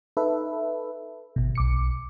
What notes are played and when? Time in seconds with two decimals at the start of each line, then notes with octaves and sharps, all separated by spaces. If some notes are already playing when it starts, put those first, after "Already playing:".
0.17 D#4 A4 B4 E5
1.36 G#1 B2
1.55 B1 D6 C#7